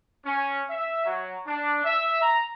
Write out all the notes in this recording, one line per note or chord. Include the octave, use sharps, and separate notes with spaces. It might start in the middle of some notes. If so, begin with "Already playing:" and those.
C#4
E5
F#3
D4
E5
A#5